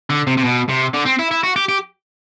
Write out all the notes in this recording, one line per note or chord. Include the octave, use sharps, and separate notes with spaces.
D3
C3
C3
B2
C3
D3
C4
E4
E4
F#4
G4
G4